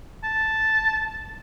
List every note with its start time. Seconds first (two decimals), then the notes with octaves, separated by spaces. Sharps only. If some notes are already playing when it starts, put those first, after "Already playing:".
0.24 A5